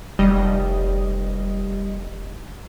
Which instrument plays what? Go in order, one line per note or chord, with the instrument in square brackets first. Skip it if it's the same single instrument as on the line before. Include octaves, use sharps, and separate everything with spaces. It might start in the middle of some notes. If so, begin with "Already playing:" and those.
[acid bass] F1 [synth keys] G3 D#5